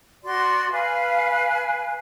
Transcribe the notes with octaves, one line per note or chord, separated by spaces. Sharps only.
F#4 D5 C6
B4 F5 G#5